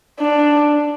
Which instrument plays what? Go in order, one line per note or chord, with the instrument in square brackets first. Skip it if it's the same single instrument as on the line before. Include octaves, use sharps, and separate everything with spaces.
[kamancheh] D4